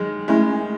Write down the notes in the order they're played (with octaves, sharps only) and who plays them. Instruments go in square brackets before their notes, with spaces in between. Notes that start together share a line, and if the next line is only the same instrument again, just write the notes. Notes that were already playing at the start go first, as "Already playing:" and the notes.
Already playing: [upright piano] D#3 G#3 [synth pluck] F#3
[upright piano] G#3 [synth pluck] A3 C#4 E4